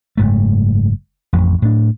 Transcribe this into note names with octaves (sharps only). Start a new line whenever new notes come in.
F#1 G#2 A3
A1 F2
A2 D4